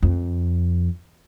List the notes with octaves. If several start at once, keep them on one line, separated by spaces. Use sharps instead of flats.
F2